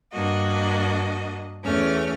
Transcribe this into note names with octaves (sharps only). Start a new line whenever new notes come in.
G2 A#3 D4 F#4 D#5
E2 A3 C#4 F6